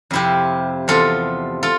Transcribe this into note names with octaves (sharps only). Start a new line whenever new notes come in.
F2 C3 F3 E4 G4
E2 C3 F3 F4 A4
F4 A4